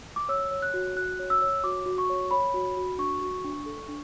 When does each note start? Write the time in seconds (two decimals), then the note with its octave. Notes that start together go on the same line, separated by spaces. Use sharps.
0.16 D6
0.29 C#5 E6
0.51 C#5
0.62 F#6
0.74 F#4
0.96 F#4 F#6
1.19 C#5
1.30 E6
1.42 C#5
1.64 F#4 D6
1.86 F#4
1.98 C#6
2.09 C#5
2.31 C#5 B5
2.54 F#4
2.77 F#4
2.98 D4 C#6
3.22 F#4
3.44 D4
3.66 A4
3.89 D4